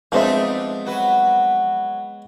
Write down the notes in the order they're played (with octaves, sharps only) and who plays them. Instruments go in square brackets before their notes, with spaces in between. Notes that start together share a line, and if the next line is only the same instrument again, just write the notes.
[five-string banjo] F3 C4 E5 [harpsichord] G#3 B3 [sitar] A3 D4 D#4
[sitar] F#3 F#4 B4